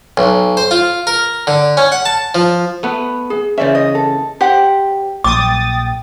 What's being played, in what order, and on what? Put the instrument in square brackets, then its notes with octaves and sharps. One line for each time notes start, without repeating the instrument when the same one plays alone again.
[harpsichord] B1
C5
F4
A#4
D3
C#4
F#5
A5
F3
[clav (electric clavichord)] A3 B3 B4
[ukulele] G#4
[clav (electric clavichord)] C#3 E3 C#4 [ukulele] C5 D5 E5
[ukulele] D#5
A4
[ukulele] G4 F#5 [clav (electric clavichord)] C5
[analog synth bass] A#1 [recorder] G5 [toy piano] D6 [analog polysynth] D#6 A6